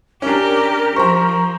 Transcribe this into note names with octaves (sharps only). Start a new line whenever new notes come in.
C#4 D4 G4 A#4
F3 C5 A#5 C#6